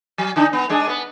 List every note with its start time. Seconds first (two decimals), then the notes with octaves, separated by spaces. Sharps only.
0.18 F#3
0.36 D3 D4 D#4
0.53 B3
0.69 G#3 D4 G#4
0.88 B3 B4